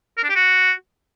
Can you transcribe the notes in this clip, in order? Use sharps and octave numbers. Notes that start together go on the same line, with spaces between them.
A#4
D4
G4
F#4